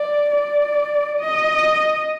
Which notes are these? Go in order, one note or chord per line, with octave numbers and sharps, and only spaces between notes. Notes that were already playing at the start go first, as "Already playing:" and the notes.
Already playing: D5
D5
D#5